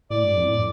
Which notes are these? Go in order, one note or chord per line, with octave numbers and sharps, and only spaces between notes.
A2 D5
G2
F2
A2